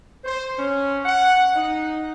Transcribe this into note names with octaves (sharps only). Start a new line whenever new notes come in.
C5
C#4
F#5
D#4